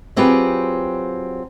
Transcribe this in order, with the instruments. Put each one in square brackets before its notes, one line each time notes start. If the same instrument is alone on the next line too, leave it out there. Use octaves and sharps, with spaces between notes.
[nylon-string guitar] F#3 C4 F4 G4 G#4 B4